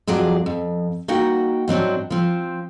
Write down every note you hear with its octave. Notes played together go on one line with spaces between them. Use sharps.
F2 F3 F#3 G#4 D5
F2
A#3 D#4 F#4 F#5 G5
G#2 F#3 C4 D4
F3 C4